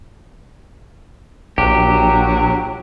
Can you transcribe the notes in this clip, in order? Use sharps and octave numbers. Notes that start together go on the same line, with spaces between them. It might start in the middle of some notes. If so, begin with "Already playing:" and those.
A#1 F#3 G4